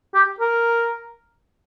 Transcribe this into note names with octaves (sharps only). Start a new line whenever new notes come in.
G4
A#4